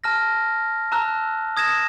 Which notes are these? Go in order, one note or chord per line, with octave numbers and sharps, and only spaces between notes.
A5 F6 A#6
A5 A#5 E6 F#6
D#6 G#6 A#6 E7